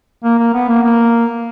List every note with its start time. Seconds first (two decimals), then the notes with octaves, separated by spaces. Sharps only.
0.24 A#3
0.39 A#3
0.54 B3
0.69 A#3
0.83 A#3